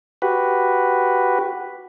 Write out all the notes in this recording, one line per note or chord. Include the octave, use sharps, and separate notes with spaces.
F#4 G4 B4